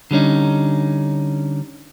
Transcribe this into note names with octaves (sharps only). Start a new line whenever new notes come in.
D3 G3 C#4 D#4